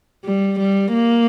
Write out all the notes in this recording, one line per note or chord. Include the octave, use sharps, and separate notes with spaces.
G3
G3
A#3